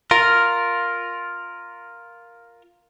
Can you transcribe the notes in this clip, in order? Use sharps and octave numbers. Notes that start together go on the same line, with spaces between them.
F4 A#4